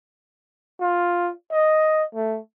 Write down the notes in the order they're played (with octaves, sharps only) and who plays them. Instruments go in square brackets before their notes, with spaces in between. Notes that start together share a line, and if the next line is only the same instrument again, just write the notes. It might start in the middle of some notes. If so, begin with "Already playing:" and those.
[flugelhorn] F4
D#5
A3